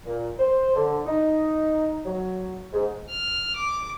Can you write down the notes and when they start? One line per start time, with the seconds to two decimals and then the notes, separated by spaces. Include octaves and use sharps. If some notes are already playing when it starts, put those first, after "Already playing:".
0.05 A#2
0.39 C5
0.75 D3
1.06 D#4
2.06 F#3
2.73 G#2
3.09 F6
3.56 D6